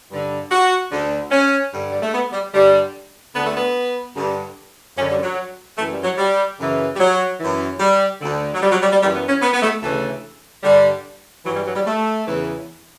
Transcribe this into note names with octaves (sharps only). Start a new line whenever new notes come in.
G2 D3
F#4
D2 D3
C#4
G2 D3
G3
A3
B3
G3
G2 D3 G3
D2 D3 B3
A3
B3
G2 D3
F#2 D3 C#4
G3
F#3
F#2 E3 A3
G3
F#3
G3
F#2 C#3 E3
G3
F#3
F#2 E3
G3
D2 D3
F#3
G3
F#3
G3
G3
F#2 E3 G3
B3
C#4
B3
B3
A3
D2 C#3 E3 A3
G2 D3 G3
G2 E3 F#3
G3
F#3
G3
A3
E2 C#3 E3